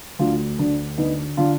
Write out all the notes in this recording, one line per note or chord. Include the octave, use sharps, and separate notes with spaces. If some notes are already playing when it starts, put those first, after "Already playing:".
D2 D4 F4
D2 D4
D3 B3 D#4
D3 D4 F4